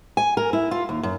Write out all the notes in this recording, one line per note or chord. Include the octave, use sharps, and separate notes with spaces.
G#5
A#4
E4
F4
D#2
F#2